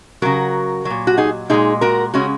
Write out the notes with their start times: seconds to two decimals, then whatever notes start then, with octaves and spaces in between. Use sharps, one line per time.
0.22 C#3 F#3 F#4 A#4
0.85 F#3
0.90 A#2
1.07 F#4
1.18 D#4 G#4
1.50 A#2 G#3 D#4 G#4
1.81 F#4 A#4
2.14 C#3 G#3 C#4 F#4